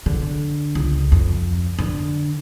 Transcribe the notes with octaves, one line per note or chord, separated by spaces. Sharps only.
D3
C#2
F2
D3